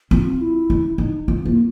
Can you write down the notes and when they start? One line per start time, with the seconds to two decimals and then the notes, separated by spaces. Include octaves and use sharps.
0.11 C4 F4
0.41 E4
0.70 C#4
0.98 D4 D#4
1.28 C4 F4
1.45 A#3